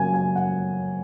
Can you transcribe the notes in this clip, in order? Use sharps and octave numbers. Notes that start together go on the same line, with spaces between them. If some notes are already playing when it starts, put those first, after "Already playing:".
Already playing: C#3 F#3 A#3 G#5
G#5
F#5